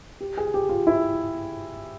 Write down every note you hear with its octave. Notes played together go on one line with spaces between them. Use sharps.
G4
G#4
G4
F4
E4